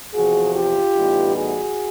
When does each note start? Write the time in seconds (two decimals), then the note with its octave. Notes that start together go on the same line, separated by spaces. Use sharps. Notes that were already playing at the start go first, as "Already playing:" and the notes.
0.15 E2 C3 F3 F#4 G#4
0.55 F4 G4
0.96 A2 E3 G3 B3 D#4
1.37 F#4 G#4